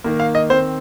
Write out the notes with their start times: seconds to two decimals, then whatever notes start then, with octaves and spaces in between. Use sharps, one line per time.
0.04 D#3 A#3
0.20 F5
0.35 D#5
0.50 D#3 C4 C5